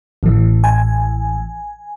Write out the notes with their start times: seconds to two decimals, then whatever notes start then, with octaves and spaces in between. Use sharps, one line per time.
0.23 A1 A2 E3
0.64 G#5